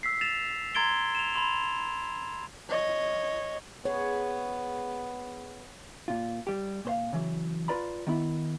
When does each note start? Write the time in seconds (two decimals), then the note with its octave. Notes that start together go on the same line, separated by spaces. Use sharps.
0.03 E6 B6 C7
0.21 A6 E7 F7
0.75 A#5 C6 G#6 A6 D7 G7
1.15 E7 F7
1.34 B5 C6 F7
2.69 C#5 D#5
3.85 G#3 B3 G#4 C#5
6.08 A#2 F4
6.47 G3 G4
6.85 A#2 C5 F5
7.13 C#3 E3 F#3
7.68 F4 B4 D5 A#5 B5
8.07 D#3 B3 E4